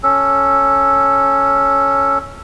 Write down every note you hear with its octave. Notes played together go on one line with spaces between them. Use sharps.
C#4 A4